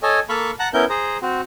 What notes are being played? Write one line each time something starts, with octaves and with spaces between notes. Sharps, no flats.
A4 C#5 D#5 G#5
A#3 A4 F5 B5 C#6
F#5 A5 A#5 F#6
B3 C#4 E4 A#4 G6
G#4 C5 A#5
C4 F#4